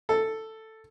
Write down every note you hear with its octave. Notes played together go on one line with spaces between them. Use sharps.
A4